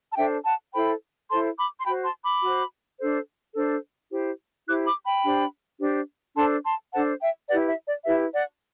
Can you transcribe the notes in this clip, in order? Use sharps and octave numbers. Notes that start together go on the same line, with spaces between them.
A5
D4 A4 C5 E5 G5
F#5 A5
E4 A4 C5 G5 B5
E4 A4 C5 A5 C6
B5 D6
C6
F#4 C5 G5 B5
A5 C6
B5 D6
F#4 C5
D4 A4 C5
D4 A4 C5
E4 G4 C5
E4 G4 C5 D6 F#6
B5 D6
G5 B5
D4 G4 C5
D4 G4 C5
D4 A4 C5 A5 C6
A5 C6
D4 A4 C5 F#5 A5
E5 G5
E4 G4 B4 D5 F#5
E5
D5
E4 G4 B4 E5
D5 F#5